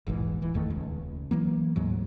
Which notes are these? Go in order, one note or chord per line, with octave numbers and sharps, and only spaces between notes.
E1 A#1 G#2 E3
D#1 E3
G1 E2 D#3 A3
D#1 C#2
E3 F#3 A#3
D2 G#2 F#3